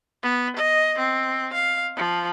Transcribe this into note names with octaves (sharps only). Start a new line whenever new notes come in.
B3
D#5
C4
F5
F3